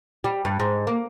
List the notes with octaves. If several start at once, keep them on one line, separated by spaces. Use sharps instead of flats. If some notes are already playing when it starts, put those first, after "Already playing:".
G3
G2
G#2
A#3